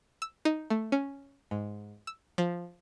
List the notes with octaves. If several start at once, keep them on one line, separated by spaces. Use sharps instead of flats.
E6
D#4
A3
C#4
G#2
E6
F3